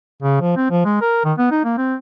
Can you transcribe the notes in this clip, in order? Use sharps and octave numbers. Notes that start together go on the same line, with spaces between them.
C#3
F3
C4
F3
G#3
A#4
D#3
B3
D#4
A#3
C4